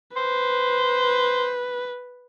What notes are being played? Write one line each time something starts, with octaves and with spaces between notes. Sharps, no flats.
B4 C5